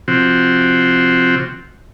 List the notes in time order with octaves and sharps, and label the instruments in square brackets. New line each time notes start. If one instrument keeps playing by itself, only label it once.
[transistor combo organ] C3 F3 C4 F#4